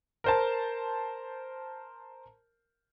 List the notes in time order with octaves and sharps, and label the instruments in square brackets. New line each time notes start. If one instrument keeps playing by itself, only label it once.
[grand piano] A#4 C5 A5